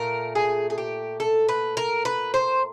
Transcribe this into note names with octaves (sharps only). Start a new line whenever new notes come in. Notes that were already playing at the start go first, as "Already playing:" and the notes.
Already playing: A#2 A3 A#4
G#4
G#4
G4
A4
B4
A#4
B4
C5